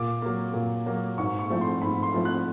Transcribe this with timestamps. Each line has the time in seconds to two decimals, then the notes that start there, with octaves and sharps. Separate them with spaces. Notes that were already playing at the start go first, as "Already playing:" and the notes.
Already playing: A#2 D6
0.22 F#3 A#3
0.54 A#2
0.86 F#3 A#3
1.18 G#2 C#6
1.39 C#6
1.50 F3 A3 C4 E4
1.61 C6
1.82 G#2 B5
2.03 C6
2.14 F3 A3 C4 E4
2.25 F#6